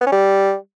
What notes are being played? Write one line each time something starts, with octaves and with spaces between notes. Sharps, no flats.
B3
C#4
G3